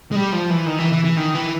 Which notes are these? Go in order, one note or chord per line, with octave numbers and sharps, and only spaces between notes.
G#3
G3
F3
E3
D#3
E3
E3
E3
D#3
E3